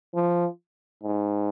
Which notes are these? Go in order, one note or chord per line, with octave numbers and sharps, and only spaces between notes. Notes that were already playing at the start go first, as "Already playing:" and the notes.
F3
G#2